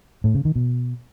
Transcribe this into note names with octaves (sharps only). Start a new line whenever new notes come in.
A2
C#3
D#3
B2